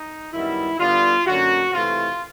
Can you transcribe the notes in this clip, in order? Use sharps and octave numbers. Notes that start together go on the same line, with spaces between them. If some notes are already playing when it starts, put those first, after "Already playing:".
Already playing: D#4
F#2 D#3 G3 B3 E4
D3 G3 B3 F4
F#2 D3 F#3 A#3 F#4
C3 E3 A3 F4